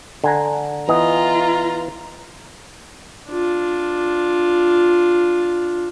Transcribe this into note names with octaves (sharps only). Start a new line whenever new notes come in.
D3 G#5 A#5
E3 B3 F4 D#5 A#5
D4 F4